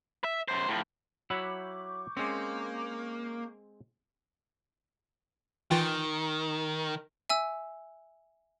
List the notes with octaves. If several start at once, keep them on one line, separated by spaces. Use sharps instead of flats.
E5
F#2 C5
A2 F3
F#3 E4 E5 F#5 B5 C#6 D6 G6
G#3 A#3 C4 C#4
D#3 E3 F4 G5
E5 G#5 E6